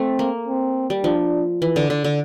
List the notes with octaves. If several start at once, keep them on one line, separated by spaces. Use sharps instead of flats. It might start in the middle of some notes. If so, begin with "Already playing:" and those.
Already playing: A3 C4
A#3
C4
G3
F3 D4
E3
D3
D3
D3